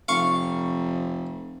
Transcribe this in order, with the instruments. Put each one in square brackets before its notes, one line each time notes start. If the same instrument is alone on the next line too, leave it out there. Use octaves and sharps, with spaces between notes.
[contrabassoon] F1 [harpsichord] F5 C#6